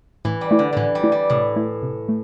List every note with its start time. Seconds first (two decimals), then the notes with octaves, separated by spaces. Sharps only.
0.25 A2 E3
0.41 G3
0.51 A3 E4
0.59 D3
0.73 A2 D3 E3
0.95 G3
1.03 A3 E4
1.12 G3
1.30 A2 C3
1.56 A3 E4
1.83 C3
2.09 A3